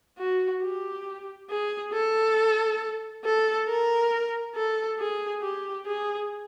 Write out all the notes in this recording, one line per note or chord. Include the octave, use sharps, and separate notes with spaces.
F#4
G4
G#4
A4
A4
A#4
A4
G#4
G4
G#4